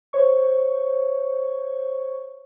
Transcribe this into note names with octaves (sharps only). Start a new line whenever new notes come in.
C5 C#5 C#6